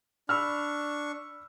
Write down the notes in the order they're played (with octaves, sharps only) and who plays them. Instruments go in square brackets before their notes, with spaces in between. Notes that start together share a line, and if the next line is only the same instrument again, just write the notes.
[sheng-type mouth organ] D4 C#6 [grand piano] B5 E6 F6